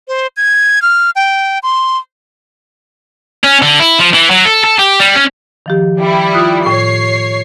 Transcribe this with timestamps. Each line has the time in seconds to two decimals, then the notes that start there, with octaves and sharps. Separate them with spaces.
0.08 C5
0.37 G#6
0.82 F6
1.16 G5
1.63 C6
3.44 C#4
3.62 D3
3.80 E4
4.00 F3
4.14 E3
4.31 F#3
4.46 A4
4.64 A4
4.79 G4
4.99 G3
5.15 C#4
5.66 D#3 F3 G4
6.00 G3 E4
6.34 F4 D#6 F#6
6.66 A2 C#5 C7